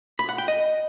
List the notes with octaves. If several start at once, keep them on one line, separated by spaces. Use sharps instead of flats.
B5
F#5
G5
D#5